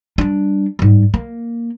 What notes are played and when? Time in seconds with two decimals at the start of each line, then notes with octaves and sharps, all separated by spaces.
0.18 G3 D4
0.79 G#2 G3
1.14 A#3